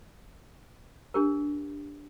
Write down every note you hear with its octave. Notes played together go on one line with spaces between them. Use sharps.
D4 G4 A#4